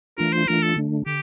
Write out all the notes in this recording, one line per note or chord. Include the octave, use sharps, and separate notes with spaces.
E3 A3 D4 F4 A#4
C5
E3 A3 D4 F4 A#4
A4
D3 A3 D4
D3 G4